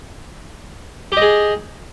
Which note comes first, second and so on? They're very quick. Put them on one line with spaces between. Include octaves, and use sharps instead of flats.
G4 D#5 G#4